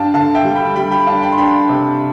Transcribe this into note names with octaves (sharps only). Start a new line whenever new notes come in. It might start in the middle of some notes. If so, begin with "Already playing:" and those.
Already playing: G2 D4 F5 G5 A5
D3 F5 A5
E5 G5
G3
G5 B5
G3 G5 B5
G5 B5
D4 F5 A5
G5 B5
C6
D4 G5 B5
C3